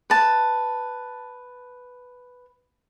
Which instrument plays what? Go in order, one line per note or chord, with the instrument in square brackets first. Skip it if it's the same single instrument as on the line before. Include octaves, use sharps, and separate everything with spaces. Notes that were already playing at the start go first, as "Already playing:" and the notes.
[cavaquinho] B4 A5